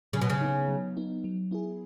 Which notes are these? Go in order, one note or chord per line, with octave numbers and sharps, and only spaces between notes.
C#3 F#3
B2
C#3
B3 D#4
F#3
B3 D#4
F#3
B3 E4 G#4